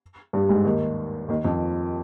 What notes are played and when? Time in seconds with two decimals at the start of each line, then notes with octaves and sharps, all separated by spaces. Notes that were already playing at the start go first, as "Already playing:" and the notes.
0.33 G2 G3
0.49 G#2 G#3
0.65 D#2 D#3
1.28 D#2 D#3
1.45 F2 F3